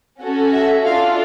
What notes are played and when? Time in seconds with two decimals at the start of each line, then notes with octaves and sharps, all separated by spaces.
0.22 C#4 F#4 A4
0.53 E5
0.85 D4 F4 A4 F5